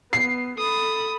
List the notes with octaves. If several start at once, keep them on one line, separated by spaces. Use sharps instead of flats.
B3 C7
A4 B5 D#6